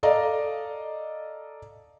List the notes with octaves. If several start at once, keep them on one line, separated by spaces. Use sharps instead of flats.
A4 D5 D#5 F5 A#5